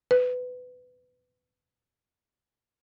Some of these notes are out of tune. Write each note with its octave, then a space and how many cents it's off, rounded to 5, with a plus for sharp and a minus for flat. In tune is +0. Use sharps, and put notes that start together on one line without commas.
B4 +20